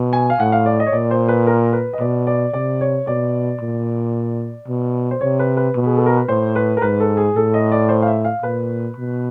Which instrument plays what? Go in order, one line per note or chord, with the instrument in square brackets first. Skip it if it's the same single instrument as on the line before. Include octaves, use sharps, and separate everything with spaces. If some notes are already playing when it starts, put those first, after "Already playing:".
Already playing: [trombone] B2
[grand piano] G#5
F5
[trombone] A2 [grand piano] F#5
[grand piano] F5
D5
D#5
C#5
[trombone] A#2 [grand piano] D5
[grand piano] C5
B4
A#4
B4
D#5
[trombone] B2 [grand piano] D5
[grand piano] D5
[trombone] C3 [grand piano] D5
[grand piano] C#5
[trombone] B2 [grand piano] D5
[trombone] A#2
B2
[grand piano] C5
[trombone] C3 [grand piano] C#5
[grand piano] B4
B4
[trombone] B2
[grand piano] G#4
A4
A#4
B4
[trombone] A2 [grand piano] C5
[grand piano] B4
A#4
[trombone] G#2 [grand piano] B4
[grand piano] A4
G#4
[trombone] A2 [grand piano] A4
[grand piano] D#5
D5
C5
F5
E5
F5
[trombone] A#2 [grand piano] B4
[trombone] B2